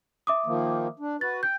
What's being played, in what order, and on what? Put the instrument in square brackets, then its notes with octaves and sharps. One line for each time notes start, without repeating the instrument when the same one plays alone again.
[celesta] E5 D6 D#6
[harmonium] D#3 F3 A#3
D4
[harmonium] F#4 B4 [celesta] A6
[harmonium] G5 [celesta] G6